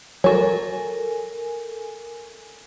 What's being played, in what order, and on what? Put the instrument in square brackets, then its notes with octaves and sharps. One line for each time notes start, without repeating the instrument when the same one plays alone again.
[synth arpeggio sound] F#3 F#4 [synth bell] A4 A#4 G#5